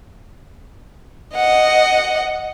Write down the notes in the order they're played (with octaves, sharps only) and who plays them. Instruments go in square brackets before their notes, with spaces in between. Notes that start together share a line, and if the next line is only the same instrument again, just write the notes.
[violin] D#5 F#5